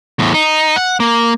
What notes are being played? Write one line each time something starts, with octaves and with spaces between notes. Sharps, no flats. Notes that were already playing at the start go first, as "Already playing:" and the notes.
E2 A2
D#4
F#5
A#3